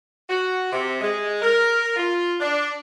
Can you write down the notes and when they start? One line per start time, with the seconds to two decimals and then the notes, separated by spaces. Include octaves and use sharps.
0.29 F#4
0.72 C3
1.01 G#3
1.42 A#4
1.96 F4
2.40 D4